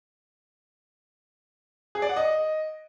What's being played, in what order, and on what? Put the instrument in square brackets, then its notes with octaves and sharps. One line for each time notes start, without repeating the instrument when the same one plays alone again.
[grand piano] G#4
D5
F#5
D#5